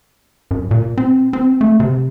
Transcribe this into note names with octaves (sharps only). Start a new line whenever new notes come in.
F#2
A#2
C4
C4
A3
C3